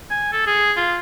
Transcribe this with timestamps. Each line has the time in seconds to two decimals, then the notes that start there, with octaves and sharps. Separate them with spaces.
0.10 G#5
0.32 A4
0.46 G#4
0.76 F4